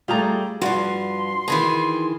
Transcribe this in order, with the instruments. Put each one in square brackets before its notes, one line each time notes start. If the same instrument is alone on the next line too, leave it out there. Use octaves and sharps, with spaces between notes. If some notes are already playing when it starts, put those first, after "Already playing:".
[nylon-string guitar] G3 A3 [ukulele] F4 G#4 A#5
[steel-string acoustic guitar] G2 F3 [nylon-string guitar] F#4 [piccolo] C6
[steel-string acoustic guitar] D#3 E3 G#4 [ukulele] B5